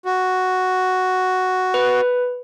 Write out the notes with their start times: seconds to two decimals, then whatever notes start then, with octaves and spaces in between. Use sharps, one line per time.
0.05 F#4
1.74 B4